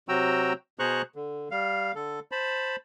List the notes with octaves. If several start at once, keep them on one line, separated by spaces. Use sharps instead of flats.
C3 F#3 F#4 G5 A#5 E6
B2 G#4 C5 A#5 C#6 F#6
D3
G3 F5
D3 A4
C5 A5 B5